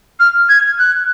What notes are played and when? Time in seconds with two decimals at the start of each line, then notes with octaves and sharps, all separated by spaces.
0.20 F6
0.49 G#6
0.79 F#6